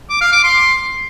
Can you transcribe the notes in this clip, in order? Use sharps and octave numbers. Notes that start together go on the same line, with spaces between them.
D6
F5
D6
C6